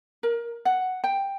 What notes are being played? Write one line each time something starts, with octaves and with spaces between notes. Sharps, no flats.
A#4
F#5
G5